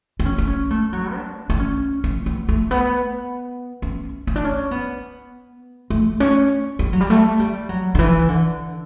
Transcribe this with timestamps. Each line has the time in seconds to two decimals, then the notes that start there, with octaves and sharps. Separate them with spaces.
0.20 D4
0.26 C#4
0.38 D4
0.47 C#4
0.70 A3
0.93 F#3
1.15 D4
1.50 D4
1.59 C#4
2.04 C#4
2.26 B3
2.49 A3
2.71 B3
3.82 C#4
4.27 C#4
4.36 D4
4.44 C#4
4.71 B3
5.90 A3
6.20 C#4
6.79 G3
6.93 F#3
7.00 G3
7.10 A3
7.39 G3
7.69 F#3
7.95 D3
7.99 E3
8.29 D3